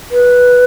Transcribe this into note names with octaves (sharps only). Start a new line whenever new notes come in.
B4